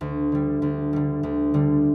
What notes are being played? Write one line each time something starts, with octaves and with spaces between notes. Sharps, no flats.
D2
D3 G3
D2
D3 G3
D2
D3 G3